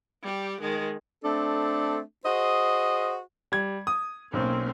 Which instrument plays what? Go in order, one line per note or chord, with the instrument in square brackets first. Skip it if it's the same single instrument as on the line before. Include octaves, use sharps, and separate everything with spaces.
[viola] G3 G4
D#3 G#3
[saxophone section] A3 C4 D4 A4
F#4 G#4 C5 D#5
[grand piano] G3 G#6
D#6
[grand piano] B1 [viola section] A#3 C4 C#4